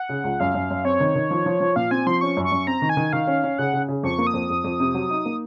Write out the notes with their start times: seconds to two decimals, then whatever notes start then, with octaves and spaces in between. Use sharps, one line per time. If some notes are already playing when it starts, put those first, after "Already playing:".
Already playing: F#5
0.09 C#3
0.24 C#2
0.40 F#2 F5
0.55 F#2
0.70 F#2
0.85 C4 C#5
1.00 D#3
1.15 D#3
1.31 F3
1.46 F3
1.60 F3
1.76 A#2 F5
1.91 C4 G#5
2.07 F3 C6
2.21 C#4 C#6
2.37 F#2
2.44 C#6
2.52 F#2
2.67 C4 A#5
2.82 D#3
2.89 G#5
2.97 D#3
3.13 D#3 F5
3.27 C#4
3.44 C#4
3.58 C#3 F#5
3.73 C#3
3.88 C#3
4.03 F2 C#6
4.19 A#3
4.27 D#6
4.34 F2
4.50 F2
4.64 F2
4.80 C3
4.94 F#3
5.10 D#4
5.26 A#3